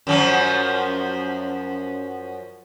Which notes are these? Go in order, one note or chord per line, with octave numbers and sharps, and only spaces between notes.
F#2 F3 F#3